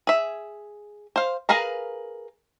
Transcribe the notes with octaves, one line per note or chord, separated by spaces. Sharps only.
G#4 E5
C5 F5
G#4 A#4 B4 F5 A#5